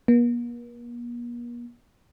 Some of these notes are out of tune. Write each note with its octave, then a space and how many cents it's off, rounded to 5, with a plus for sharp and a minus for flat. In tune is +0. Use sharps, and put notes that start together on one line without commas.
A#3 +45